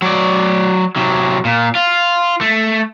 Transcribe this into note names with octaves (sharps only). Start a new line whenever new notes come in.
F#3 D5
C3 F#3
A#2
F4
A3